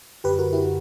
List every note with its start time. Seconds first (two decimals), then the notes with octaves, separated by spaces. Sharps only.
0.24 F#2 D3 G4 B4
0.39 F#4 A#4
0.53 E4 G4